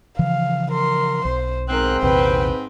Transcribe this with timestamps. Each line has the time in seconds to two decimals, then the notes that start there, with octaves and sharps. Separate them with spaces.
0.19 C#3 E3 F3 F5
0.72 A#4 C6
1.25 B1 C5
1.69 G#2 C4 A#4 F#6
2.03 A#1 E2 C3 B4 G5